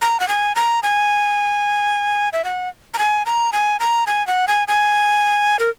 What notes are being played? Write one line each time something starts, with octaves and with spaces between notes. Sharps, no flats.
A#5
F#5
G#5
A#5
G#5
E5
F#5
A#5
G#5
A#5
G#5
A#5
G#5
F#5
G#5
G#5
A#4